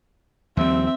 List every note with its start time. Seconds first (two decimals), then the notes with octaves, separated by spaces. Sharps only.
0.57 D#2 F3 G3 C4 E5